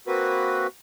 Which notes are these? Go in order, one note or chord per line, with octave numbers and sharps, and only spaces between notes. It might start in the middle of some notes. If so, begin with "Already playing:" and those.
A#3 C4 F#4 B4